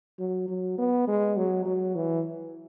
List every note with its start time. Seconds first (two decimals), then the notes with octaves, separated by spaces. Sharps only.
0.19 F#3
0.48 F#3
0.79 B3
1.08 G#3
1.37 F#3
1.66 F#3
1.95 E3